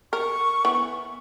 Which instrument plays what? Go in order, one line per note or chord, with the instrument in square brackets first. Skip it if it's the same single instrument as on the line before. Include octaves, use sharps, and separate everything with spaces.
[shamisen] A#4 [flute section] C#6
[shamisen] E3 B3